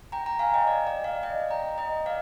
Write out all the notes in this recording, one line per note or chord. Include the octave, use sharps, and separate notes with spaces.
G5 A#5
G5 A#5
F5 G#5
D#5 G5
D5
D5
D5 F5
D#5 G5
G5 A#5
D#5 G5
D5 F5